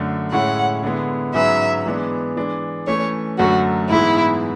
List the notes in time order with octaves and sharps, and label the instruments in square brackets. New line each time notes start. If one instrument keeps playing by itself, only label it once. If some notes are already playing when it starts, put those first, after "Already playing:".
Already playing: [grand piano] F#2 D3 A3
[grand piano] A2 G#3 C#4 E4 [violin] F#5
[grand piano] D3 G#3 B3 E4
[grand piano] G#2 F#3 C#4 G#4 B4 [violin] E5
[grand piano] E3 G#3 B3 D4
E3 G#3 D4
[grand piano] E3 A3 C#4 [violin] C#5
[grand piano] F#2 D3 F#3 A3 [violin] F#4
[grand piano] G#2 E3 G#3 B3 [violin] E4